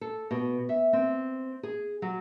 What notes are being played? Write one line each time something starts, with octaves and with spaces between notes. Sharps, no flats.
A4
B2
E5
C4
G#4
F#3